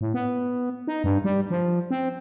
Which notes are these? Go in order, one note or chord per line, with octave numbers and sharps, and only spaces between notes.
A2
B3
D#4
G2
G3
F3
C4